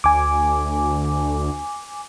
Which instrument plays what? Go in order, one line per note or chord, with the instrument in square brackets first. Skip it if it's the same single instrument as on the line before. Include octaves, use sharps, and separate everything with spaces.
[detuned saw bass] D2 [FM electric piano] G#5 D6